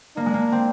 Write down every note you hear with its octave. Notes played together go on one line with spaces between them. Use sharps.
A#3 D4
G#3
A#3
C4